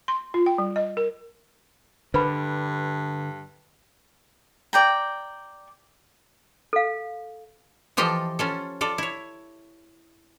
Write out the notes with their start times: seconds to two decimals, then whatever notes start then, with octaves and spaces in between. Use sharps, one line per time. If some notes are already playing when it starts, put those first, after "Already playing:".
0.08 C6
0.34 F4
0.46 G5
0.58 G3
0.76 D#5
0.97 A#4
2.14 G2 D3 B4 B5
4.73 D5 G5 A#5
6.73 A4 F5
7.97 E3 F3 F4 G4 A4 D#5
8.39 C#4 F4 A4
8.81 F4 A4 D5
8.98 E4 C#5